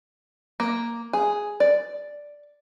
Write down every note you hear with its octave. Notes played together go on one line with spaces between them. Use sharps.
A#3
G#4
D5